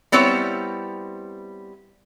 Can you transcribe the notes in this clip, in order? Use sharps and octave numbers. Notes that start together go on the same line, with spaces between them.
G3 B3 C4 E4 C#5